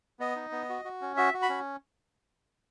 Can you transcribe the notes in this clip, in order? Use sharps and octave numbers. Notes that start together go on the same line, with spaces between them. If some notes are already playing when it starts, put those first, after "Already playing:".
B3 D#5
D#4
B3
F#4
F#4
C#4
F#4 E5
F#4
B5
C#4